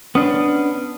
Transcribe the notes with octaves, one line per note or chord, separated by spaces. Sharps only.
B3 C#4 D4 D#6